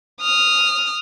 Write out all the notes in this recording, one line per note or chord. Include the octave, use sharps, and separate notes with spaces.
D#6 F6